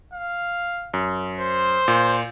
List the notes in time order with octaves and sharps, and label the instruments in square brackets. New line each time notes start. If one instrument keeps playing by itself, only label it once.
[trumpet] F5
[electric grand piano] F#2
[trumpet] C5
[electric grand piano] A#2